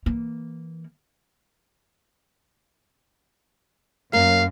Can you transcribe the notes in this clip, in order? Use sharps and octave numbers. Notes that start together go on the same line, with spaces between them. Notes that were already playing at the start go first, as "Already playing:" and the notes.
E3 A#3
F#2 A#3 F5